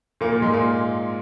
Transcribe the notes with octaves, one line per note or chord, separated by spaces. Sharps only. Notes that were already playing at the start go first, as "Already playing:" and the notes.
A#2 A#3
A#2 A#3
G#2 G#3
A#2 A#3